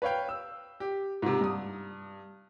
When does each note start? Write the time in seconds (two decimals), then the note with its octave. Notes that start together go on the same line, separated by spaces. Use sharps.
0.02 B4 C#5 F5 G5
0.29 E6
0.80 G4
1.22 G#2 C3
1.41 G2 D#6